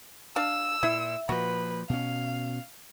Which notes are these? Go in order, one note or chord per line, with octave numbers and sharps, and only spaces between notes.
D4 F5 E6
A#2 E4
A#2 F3 F#4 B4
B2 C#4 F5